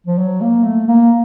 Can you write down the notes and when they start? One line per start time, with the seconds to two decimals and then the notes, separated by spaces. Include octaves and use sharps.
0.06 F3
0.19 F#3
0.41 A#3
0.64 A3
0.88 A#3